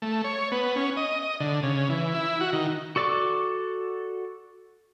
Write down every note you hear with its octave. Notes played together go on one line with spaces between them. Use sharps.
A3
C#5
B3
C#4
D#5
D#5
D3
C#3
E3
E4
F#4
D#3
F#4 A4 D5 C#6 D6